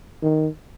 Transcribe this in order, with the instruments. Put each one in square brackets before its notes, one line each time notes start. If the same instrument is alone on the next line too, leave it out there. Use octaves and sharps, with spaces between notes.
[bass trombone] D#3